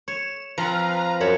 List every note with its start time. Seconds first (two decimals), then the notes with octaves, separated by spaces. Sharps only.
0.08 C#5 E7
0.58 F3 C4 B4 F5 A#5
1.20 F#2 C#5 A5 B5